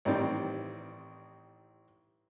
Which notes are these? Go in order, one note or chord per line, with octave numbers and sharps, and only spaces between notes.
A1 D#3 G3 C4 D5